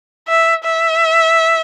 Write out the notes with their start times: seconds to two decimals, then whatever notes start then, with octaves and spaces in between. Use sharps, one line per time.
0.28 E5
0.64 E5